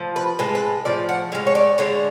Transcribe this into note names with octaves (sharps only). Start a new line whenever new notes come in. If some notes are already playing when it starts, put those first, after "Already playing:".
Already playing: A2 F3
B4
A2 G#3 B4
B4
A2 F3 D5
F#5
A2 G#3 F5
C#5
D5
D3 G#3 C#5